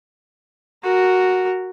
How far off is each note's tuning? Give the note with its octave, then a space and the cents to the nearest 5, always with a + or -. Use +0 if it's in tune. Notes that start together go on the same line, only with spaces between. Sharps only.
F#4 +0 A#4 -10